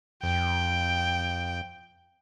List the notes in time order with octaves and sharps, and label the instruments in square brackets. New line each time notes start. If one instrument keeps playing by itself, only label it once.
[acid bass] F2 [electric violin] G5